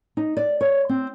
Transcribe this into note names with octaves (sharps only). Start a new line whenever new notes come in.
D#4
D5
C#5
C4